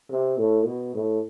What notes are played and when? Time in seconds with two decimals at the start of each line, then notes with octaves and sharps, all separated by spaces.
0.11 C3
0.38 A2
0.66 B2
0.95 A2